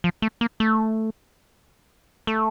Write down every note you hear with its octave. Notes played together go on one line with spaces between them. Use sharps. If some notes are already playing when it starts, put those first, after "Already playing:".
F3
A3
A#3
A3
A3